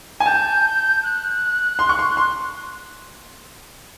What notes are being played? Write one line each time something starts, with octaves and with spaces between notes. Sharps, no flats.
G#5
A5 G6
F#6
C6
C#6
C6
C6